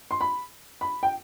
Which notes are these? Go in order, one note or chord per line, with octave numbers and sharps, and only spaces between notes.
C6
B5
B5
G5